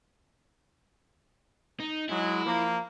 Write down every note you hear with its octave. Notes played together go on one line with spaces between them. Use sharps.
D#4
F#3 G#3 E4
F3 A#3